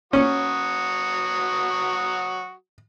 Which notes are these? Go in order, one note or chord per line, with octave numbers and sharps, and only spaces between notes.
F#3 C#4 F#4 D#6